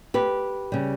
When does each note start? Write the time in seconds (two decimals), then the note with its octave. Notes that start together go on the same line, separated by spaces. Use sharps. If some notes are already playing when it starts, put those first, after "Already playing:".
0.14 G4 B4
0.72 C#3 G3